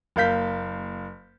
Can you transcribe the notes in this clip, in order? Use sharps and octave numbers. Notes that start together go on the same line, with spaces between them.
F#1 A#3 F5 G6 B6